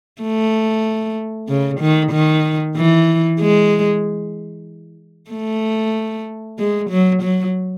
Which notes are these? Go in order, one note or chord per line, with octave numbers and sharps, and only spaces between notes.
A3
C#3
D#3
D#3
E3
G#3
A3
G#3
F#3
F#3